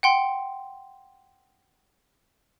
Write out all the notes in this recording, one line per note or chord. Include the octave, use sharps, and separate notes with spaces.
F#5 G5 C6